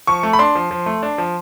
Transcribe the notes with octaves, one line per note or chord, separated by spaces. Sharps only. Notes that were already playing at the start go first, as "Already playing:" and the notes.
F3 C#6
A3
B5
D4 C6
F3
F3
A3
D4
F3